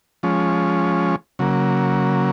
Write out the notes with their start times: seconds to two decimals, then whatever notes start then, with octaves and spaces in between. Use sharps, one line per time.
0.23 F3 G#3 C#4
1.39 C#3 F#3 A#3